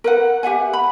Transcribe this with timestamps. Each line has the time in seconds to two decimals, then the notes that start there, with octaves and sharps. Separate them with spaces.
0.04 A#4 B4 F#5
0.43 G4 E5 F#5 G#5
0.73 B5